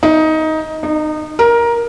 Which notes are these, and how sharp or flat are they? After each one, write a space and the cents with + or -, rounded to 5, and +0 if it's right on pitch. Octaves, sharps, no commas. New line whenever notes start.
D#4 +15
D#4 -25
A#4 +15